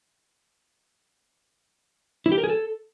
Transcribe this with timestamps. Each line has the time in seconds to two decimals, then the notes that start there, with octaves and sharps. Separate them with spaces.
2.26 E4
2.32 G4
2.38 A#4
2.44 G#4
2.50 A4